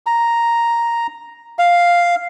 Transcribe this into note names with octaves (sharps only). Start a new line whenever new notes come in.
A#5
F5